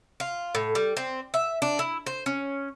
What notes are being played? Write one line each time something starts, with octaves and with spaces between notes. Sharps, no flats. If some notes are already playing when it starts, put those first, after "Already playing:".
F4
A2
G3
C4
E5
D4
E4
C5
C#4